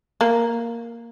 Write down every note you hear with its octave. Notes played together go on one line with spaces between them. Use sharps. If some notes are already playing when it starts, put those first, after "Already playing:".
A#3